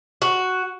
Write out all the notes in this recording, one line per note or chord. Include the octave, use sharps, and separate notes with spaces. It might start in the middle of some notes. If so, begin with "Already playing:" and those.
F#4